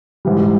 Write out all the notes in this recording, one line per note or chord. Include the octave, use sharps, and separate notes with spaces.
G#2 E3 G3